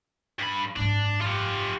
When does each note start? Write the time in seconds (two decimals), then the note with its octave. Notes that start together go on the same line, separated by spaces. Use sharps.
0.39 G2 B5
0.76 G#1 F#2 D4
1.22 F4 G4